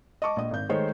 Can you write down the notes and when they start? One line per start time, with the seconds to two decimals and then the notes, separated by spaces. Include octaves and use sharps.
0.22 D#5 A5 C#6 D6
0.36 A#1 D#5
0.51 G#1 G6
0.69 D#3 G#3 A3 C5 C#5 D#5